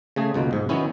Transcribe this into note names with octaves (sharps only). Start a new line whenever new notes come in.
C#3 A3 G#4
C#2 B2 D#3 A#3
B1 G#2
D#3 F#3 B3 C#4 E4